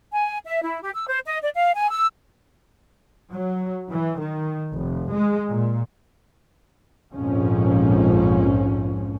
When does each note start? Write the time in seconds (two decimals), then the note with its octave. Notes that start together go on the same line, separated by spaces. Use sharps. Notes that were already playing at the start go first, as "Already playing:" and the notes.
0.11 G#5
0.45 E5
0.62 E4
0.81 G4
0.93 E6
1.08 C5
1.25 D#5
1.41 D5
1.53 F5
1.75 G#5
1.90 E6
3.32 F#3
3.92 E3
4.21 D#3
4.74 F1
5.14 G#3
5.51 A#2
7.14 A#1 F2 G#2 F3 C#4